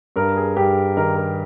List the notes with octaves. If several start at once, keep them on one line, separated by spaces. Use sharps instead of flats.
G2 A#4
G#4
G2 G4
D#3 A#4
A#4